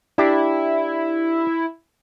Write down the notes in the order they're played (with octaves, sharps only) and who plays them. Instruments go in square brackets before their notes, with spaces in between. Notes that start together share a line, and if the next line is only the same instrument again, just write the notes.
[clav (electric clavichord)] D4 G4 [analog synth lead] E4